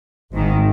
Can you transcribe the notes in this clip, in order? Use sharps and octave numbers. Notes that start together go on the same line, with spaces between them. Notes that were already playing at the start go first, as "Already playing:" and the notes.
G#1 G#2 D#3